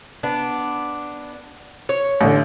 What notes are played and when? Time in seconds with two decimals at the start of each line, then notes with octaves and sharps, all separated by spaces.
0.23 B3 D4
1.89 C#5
2.21 A1 D3